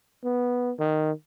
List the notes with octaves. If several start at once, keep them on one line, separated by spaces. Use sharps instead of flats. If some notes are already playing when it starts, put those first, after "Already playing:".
B3
D#3